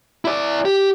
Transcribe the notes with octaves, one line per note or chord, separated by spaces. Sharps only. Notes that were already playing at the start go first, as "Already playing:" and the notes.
E4 D5
G4